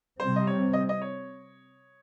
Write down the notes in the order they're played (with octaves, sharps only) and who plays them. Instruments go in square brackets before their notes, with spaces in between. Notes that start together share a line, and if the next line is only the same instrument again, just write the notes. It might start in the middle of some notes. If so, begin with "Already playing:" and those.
[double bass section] C3 G3 C4 [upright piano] C5
[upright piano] D#5
C#5
D#5
D#5
C#5